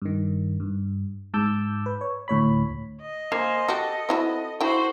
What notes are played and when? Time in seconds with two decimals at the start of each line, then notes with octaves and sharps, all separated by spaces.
0.02 G2 D#3
0.60 G2
1.34 G#2 A5 D6 E6 G6
1.86 B4
2.01 C#5
2.28 D2 A2 C#5 B5
3.01 D#5
3.32 A#3 C5 F5 G#5
3.68 F#4 G4 A4
4.09 C4 E4 F#4
4.61 E4 F#4 C5 G5